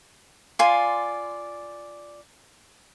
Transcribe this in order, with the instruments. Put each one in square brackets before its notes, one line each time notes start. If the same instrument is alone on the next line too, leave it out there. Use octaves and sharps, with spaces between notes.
[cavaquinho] F4 D5 G#5 C6